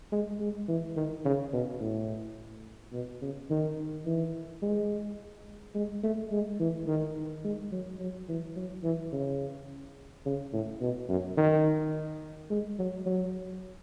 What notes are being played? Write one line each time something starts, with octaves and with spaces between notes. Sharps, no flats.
G#3
G#3
E3
D#3
C#3
B2
A2
B2
C#3
D#3
E3
G#3
G#3
A3
G#3
E3
D#3
G#3
F#3
F#3
E3
F#3
E3
C#3
C#3
A2
B2
F#2
D#3
G#3
F#3
F#3